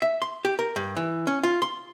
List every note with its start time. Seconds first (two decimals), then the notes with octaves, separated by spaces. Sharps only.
0.02 E5
0.22 C6
0.45 G4
0.59 A#4
0.76 G2
0.96 E3
1.27 C#4
1.43 F4
1.62 C6